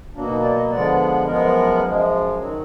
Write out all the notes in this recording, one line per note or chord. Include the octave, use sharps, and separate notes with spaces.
B2 F#3 A#3 D4
D#4
D5
D#5
D3 F3 G#3 B3 D5
F#2 F3 G#3 B3 A#4
F#2 F3 G#3
D#3 F#3